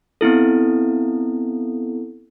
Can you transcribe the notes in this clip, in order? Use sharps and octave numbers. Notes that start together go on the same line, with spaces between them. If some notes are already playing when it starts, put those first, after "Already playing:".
B3 C4 E4 A4